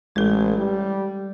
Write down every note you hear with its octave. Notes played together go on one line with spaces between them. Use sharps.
A1 G#3 A4
G3